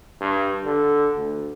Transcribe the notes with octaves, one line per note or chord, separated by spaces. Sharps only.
G2
D3
D2